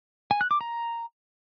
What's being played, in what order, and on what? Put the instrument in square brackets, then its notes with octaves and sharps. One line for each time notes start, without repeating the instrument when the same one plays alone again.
[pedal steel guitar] G#5
F#6
D6
A#5